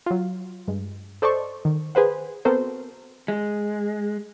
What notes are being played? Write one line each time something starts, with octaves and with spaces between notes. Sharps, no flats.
F#3 F4
G2 G#3
A4 C5 D5 D#5 A5 C#6
D#3
G#4 B4 C5 F#5
B3 C4 F#4 A4 A#4 C5
G#3